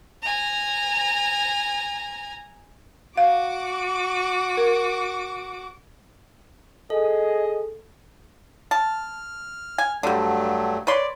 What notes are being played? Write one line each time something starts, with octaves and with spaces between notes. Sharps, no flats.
G#5 A#5
F#4 F5 D6
A#4
G#4 A4 D#5
A5 F6
G#5
G2 D3 F#3 G3 A3
B4 C#5 D5 C6